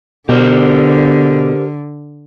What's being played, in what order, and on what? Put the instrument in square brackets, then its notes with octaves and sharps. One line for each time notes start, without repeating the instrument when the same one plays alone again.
[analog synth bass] B2 [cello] D3 [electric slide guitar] G4 A#4 C5